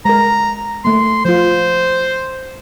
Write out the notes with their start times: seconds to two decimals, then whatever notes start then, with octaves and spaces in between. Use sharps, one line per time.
0.05 G#3 A#4 A#5
0.85 A3 A#3 C6
1.25 F3 F4 C5